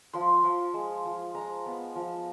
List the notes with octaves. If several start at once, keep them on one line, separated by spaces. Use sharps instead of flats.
F3 C6
F3
G#3
F3
G#3 A#5
B3
F3